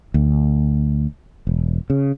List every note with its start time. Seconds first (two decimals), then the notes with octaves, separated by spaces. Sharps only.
0.14 D2
1.47 E1
1.90 C#3